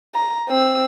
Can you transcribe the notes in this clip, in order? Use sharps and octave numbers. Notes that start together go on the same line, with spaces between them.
A#5
C4 E6